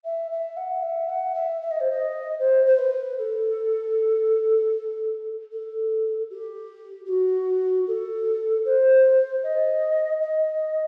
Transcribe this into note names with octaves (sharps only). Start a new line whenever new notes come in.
E5
E5
F#5
E5
F#5
E5
E5
D#5
C5
D#5
C5
C5
B4
A4
A4
G4
G4
F#4
A4
C5
D#5
D#5